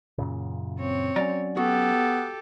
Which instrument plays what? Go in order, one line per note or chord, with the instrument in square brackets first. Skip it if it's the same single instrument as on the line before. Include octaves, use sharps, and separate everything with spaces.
[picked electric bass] F#2 A#2 C#3
[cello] C4 C#5
[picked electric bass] F#3 C#4 [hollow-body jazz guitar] D5 A#5
[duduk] B3 [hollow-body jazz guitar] F#4 [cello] G4 A4